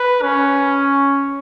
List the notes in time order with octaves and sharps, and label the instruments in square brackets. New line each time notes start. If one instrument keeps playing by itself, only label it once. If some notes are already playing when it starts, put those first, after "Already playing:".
Already playing: [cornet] B4
C#4